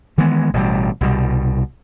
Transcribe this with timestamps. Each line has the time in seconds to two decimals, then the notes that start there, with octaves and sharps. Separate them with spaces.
0.18 D#3 E3 G#3 B3
0.54 A1 B2 D3 G3
1.01 C2 B2 G3